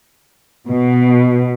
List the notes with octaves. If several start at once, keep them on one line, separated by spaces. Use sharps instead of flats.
B2